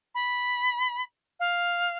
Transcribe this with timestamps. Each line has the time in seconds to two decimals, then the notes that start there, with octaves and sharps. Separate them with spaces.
0.15 B5
1.40 F5